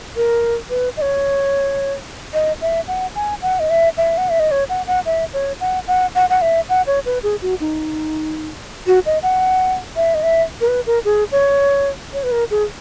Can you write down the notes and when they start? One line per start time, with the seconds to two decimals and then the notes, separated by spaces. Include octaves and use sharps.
0.16 A#4
0.70 B4
0.97 D#5
1.02 C#5
2.34 D#5
2.62 E5
2.88 F#5
3.16 G#5
3.42 F#5
3.60 D#5
3.70 E5
3.97 E5
4.18 F#5
4.30 E5
4.40 D#5
4.51 C#5
4.69 F#5
4.87 F#5
5.06 E5
5.34 C#5
5.60 F#5
5.88 F#5
6.15 F#5
6.30 F#5
6.42 E5
6.69 F#5
6.87 C#5
7.06 B4
7.23 G#4
7.42 F#4
7.60 D#4
8.87 F#4
9.06 D#5
9.23 F#5
9.96 E5
10.15 D#5
10.23 E5
10.61 A#4
10.68 B4
10.86 A#4
11.05 G#4
11.32 C#5
12.13 C#5
12.23 B4
12.32 A#4
12.51 G#4